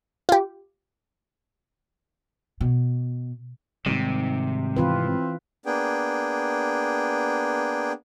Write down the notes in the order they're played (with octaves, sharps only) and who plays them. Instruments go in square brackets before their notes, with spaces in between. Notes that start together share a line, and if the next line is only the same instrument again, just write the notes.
[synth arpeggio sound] F4 G4
[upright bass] B2
[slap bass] G#2 D#3 G3 [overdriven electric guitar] C3
[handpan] E3 F4 B4 [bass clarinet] C4
[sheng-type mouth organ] A#3 B3 D4 G#4 G5